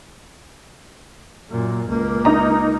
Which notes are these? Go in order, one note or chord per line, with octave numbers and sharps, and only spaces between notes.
F#2 A#2
C#2 A#3
D#4 D#5 A#5